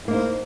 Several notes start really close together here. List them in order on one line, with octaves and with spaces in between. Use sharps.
E4 A#3 D#4 C5